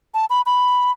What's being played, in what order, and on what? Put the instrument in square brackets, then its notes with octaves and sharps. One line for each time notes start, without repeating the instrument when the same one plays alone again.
[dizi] A5
B5
B5